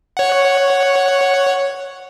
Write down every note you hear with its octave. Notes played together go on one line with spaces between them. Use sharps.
C#5 F#5